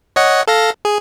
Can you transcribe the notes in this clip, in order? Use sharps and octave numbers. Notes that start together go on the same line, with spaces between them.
C#5 D#5 F#5
A4 F5 A#6
G#4